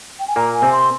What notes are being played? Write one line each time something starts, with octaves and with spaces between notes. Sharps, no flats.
G5
G#5
A#2 A#3 A#5
G#5
C3 C4
C6